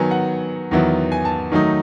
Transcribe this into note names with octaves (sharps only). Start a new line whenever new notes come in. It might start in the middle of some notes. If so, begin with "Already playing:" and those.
Already playing: D#3 F#3 B3 G#5
F#5
E2 D#3 F#3 B3 E4
G#5
A5
D#3 F#3 A3 D#4